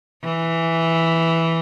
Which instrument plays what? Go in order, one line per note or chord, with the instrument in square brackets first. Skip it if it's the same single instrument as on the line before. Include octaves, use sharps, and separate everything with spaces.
[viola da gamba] E3